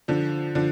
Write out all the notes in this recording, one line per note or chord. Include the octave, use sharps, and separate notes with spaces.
D3 F3
D3 F3